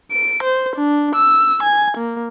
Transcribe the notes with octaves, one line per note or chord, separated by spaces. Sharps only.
D7
C5
D4
E6
G#5
A#3